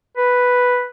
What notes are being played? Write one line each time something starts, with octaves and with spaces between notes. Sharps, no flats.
B4